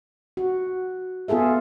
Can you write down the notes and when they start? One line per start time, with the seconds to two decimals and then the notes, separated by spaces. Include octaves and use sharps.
0.37 F#4
1.28 B3 F4 G#4 A4 E5